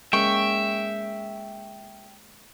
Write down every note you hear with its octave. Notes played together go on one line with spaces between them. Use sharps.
G#3 A#3 C#4 E5 G5 C#6